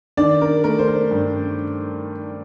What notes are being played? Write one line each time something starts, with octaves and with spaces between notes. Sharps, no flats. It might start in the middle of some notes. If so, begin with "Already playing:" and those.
D#3 D4 D5
A#4
A3 A#4
C5
A#4
G2